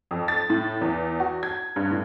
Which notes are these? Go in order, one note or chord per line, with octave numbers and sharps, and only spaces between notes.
F2
A6
A2
E2
F#4
G#6
G2
A2